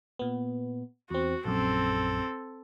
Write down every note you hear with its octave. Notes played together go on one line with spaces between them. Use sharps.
A#2 B3
E2 C4 F#4
A#1 F#2 C4 A4